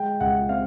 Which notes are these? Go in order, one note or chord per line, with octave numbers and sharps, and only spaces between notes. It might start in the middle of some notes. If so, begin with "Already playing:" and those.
Already playing: G#3 G5
C#2 F#5
C4 F5